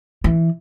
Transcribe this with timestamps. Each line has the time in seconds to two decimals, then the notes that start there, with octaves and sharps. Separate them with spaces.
0.24 E3